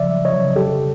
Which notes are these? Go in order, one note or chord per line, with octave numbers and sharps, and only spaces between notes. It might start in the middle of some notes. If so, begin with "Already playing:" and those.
Already playing: C#3 F3 D5 E5
F#3
F#3 C#5 D#5
C#3
F2 G4 A4